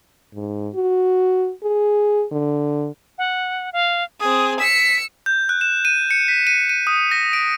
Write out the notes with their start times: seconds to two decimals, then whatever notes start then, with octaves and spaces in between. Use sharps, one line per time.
0.35 G#2
0.75 F#4
1.63 G#4
2.32 D3
3.18 F#5
3.73 F5
4.20 C4 G#4 D#6
4.60 E6 B6 C#7
5.26 G6
5.49 F#6
5.61 E7
5.85 D#7
6.11 C#7
6.28 B6
6.47 D#7
6.69 D#7
6.87 D#6
7.11 A#6
7.33 D7